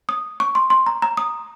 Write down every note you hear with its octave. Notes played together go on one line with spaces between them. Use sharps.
D#6
C#6
C6
C6
A#5
A#5
D#6